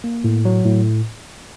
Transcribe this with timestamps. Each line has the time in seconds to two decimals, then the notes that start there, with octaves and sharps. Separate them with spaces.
0.04 A#3
0.24 A2
0.45 F#3
0.65 A2